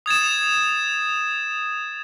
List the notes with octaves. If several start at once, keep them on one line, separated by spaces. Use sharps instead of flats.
D#6 G#6 A6 E7